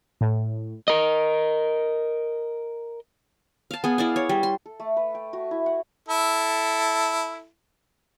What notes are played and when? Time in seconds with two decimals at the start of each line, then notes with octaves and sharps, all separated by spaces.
0.21 A2
0.88 A#4 D#5
3.71 F5 A5
3.84 B3 G#4
3.98 E4 D5 F5
4.16 C#5
4.29 G3
4.43 C6
4.66 A4
4.80 A3
4.97 B4
5.15 G5
5.33 F#4
5.51 E4
5.66 F#5
6.09 E4 A4